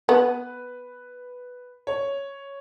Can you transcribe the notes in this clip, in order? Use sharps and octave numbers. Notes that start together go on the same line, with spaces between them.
B3 B4
C#5